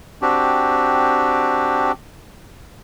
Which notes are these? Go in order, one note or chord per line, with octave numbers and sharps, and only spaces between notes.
C4 D4 F#4 G4